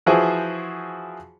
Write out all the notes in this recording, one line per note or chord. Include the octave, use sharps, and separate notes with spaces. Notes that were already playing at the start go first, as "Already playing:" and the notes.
E3 F3 E4 F#4 G#4 C5